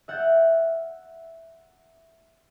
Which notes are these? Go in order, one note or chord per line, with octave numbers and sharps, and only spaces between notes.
E5 F#5 F6 G6 A6